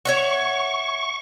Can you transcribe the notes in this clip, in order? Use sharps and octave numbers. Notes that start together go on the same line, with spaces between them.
C#5 E5 F#5 C#6